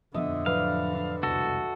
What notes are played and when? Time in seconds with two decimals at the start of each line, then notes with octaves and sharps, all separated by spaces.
0.14 D#1 F2 D3 F3 B3 D#5 E5
0.46 A2 F3 F#3 B4 D5 F5
1.23 E1 C2 F#4 A4